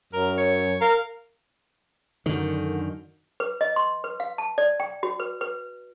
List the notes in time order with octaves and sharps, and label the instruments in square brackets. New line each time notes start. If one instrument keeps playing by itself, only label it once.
[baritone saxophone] F#2 [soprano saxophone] A#4
[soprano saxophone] C#5
[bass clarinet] A#4 [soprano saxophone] F5
[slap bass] F#2 D#3 [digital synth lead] D3
[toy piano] B4
D#5
C6
B4
F5
A5
D5
G5
F#4
B4
B4